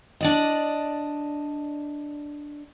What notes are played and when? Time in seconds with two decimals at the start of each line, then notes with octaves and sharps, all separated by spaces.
0.21 D4 D5 D#5